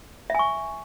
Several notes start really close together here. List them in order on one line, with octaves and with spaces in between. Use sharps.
E5 G#5 C#6